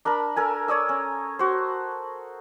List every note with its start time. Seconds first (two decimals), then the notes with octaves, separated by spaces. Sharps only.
0.05 D4 A#4 A5 B5
0.36 A4 A#4 G#5
0.68 C#5 D5 D#6 E6
0.89 C#4
1.39 F#4 C5